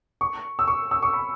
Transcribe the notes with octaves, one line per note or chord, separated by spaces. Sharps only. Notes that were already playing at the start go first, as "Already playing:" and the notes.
C#6
E6
C#6
E6
C#6
B5